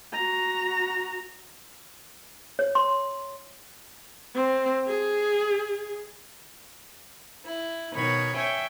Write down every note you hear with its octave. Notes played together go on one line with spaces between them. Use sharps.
F#4 A#5
C#5
C6
C4
G#4
E4
B2 D#3 C#5 B5
C#5 E5 G5 G#5